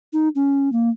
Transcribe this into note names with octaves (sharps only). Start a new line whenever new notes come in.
D#4
C#4
A#3